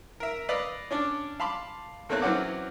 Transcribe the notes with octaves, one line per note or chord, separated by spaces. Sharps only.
A#4 E5
B4 D5 D#5 F5 B5 E6
C#4 D4 D5
F5 A5 B5 C6 D6
E2 A3 A#3 C4 C#5 F#6
E3 F#3 C4 C#4 F#5 D6